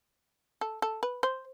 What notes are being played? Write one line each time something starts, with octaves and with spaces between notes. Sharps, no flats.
A4
A4
B4
C5